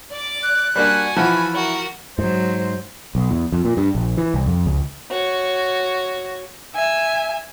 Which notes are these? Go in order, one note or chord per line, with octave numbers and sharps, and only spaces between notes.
D5 D6
F#6
G3 A#3 D4 F#4 G#5
E3 F3 F#5 B5
F#4 A#4
G#2 F#3 C5
B1
E2
F2
A#2
G2
A#1
E3
C2
F2
C#2
F#4 C#5
E5 G#5